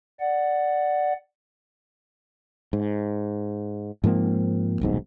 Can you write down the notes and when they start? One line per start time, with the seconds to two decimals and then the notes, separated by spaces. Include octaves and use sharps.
0.20 D5 F#5
2.73 G#2
4.04 G#2 F3 A#3 C4
4.81 D#1 B1 G#2